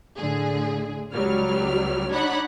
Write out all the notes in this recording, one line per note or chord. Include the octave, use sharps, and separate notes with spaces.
A2 D3 G#4
C#2 F#3 G3 F6
D4 D#4 C#5 F#5 B5